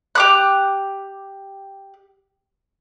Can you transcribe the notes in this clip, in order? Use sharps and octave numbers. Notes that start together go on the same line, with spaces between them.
G4 D6 F#6